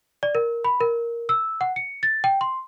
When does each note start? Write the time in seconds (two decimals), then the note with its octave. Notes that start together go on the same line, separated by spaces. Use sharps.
0.23 D5
0.35 A#4
0.64 B5
0.81 A#4
1.29 E6
1.61 F#5
1.76 C#7
2.03 A6
2.24 G5
2.41 C6